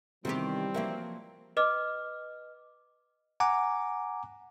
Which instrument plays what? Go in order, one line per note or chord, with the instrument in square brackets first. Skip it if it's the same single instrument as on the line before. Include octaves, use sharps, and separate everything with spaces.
[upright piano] C3 [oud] D#3 B3 G4 [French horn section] E3 G3 [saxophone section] C4
[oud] F3 F#3 A#3 [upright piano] A#4 E5
[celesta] B4 D#5 D6 F6
[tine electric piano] F#5 G#5 A#5 D6